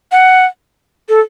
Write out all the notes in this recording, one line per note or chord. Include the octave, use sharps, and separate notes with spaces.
F#5
A4